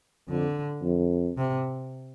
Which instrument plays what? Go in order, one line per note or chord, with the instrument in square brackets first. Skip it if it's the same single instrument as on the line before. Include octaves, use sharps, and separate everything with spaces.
[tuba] F2 [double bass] D3
[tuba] F2
[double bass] C3